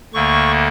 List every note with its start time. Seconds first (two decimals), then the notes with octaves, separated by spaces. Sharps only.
0.14 D2 D3 A#3 C#6